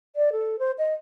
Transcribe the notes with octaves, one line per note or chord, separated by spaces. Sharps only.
D5
A4
C5
D#5